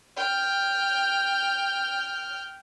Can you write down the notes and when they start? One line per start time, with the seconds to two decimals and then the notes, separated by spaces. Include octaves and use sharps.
0.17 G5 F6